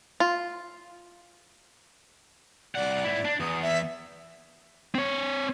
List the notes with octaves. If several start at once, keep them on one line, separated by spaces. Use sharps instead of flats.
F4
C2 D5 F#5
G#2 E4
D4
E2 D#6
E5
C4 C#5